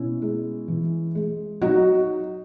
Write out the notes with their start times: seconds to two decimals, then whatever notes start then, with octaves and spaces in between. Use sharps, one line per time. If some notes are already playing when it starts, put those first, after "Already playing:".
Already playing: B2 C#4 E4
0.22 G#3
0.68 E3
1.15 G#3
1.61 F#3 D#4 F#4